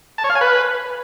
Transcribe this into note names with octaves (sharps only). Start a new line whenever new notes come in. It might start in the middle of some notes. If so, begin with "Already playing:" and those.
A5
C#5
F5
G#5
B4